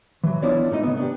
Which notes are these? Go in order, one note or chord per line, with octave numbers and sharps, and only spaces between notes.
E3 F#3
B3 D4 E4 F4 C#5 D5
G#2 A3 D#4 D#5
C#3 B3
B3 D4 G4